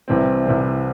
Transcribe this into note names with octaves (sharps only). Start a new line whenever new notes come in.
C2 C3 E3 C4
C2 C3 E3 C4